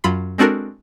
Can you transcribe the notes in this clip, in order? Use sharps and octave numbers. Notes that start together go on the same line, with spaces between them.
F#2 F#3 F4 B5 C6
G#3 C4 D4 F#4 A4 A#4